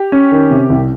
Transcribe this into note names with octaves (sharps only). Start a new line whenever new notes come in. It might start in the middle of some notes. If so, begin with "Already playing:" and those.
Already playing: G4
C#4
D#3
C3
C2